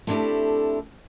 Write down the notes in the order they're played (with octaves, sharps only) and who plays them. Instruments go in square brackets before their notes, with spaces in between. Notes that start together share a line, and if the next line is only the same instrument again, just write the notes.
[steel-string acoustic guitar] A3 C4 D4 E4 G4 A4